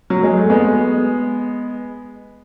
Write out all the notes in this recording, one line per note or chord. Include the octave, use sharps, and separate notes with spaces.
F#3
G#3
A3
G#3 B3